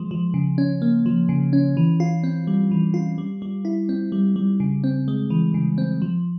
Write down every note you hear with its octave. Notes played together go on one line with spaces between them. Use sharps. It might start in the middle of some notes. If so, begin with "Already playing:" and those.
Already playing: F3 G#3
F3
C#3
C#4
A#3
F3
C#3
C#4
E3
F4
C4
G3
E3
F4
G3
G3
E4
C4
G3
G3
C#3
C4
G#3
E3
C#3
C4
F3